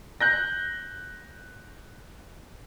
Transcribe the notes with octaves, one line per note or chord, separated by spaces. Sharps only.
F#6 G6 A#6